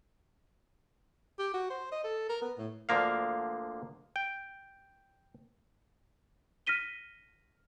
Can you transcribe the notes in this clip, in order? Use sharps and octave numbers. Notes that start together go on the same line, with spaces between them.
G4
F#4
C5
D#5
A4
A#4
B3
A2
D2 D3 F3 A#3 F5
G5
F6 A#6 B6 D#7 G7